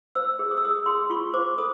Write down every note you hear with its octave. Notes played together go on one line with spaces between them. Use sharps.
C5 E6
G#4
D#6
E6
G#4 D#6
G#4 C6
F4 C#6
C5 D6
A4 D#6